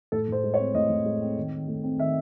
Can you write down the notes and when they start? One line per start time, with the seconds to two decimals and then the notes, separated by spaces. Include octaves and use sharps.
0.12 A2 A4
0.28 A2 C5
0.43 G#3
0.54 C#5
0.59 C4
0.75 A2 D#5
0.89 A2
1.06 G#3
1.22 C4
1.37 D#3
1.52 D#3
1.68 A3
1.83 C4
1.99 D#3 E5